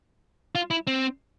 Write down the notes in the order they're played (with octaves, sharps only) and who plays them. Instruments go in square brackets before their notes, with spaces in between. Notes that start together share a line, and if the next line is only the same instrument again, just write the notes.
[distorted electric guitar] F4
E4
C4